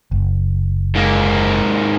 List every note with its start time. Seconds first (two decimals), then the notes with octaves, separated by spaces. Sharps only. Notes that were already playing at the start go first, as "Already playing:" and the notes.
0.11 F#1
0.96 G#2 A#3